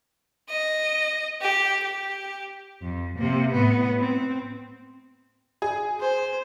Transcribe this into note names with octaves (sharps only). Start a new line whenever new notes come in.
D#5
G4
G4
F2
C3 A#3
A2 B3
C4
G#4
C5